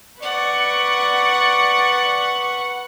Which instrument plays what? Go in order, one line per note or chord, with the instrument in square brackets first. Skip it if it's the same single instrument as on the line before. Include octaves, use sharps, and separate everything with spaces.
[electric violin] B4 C#6 [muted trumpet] D5 [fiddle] F#5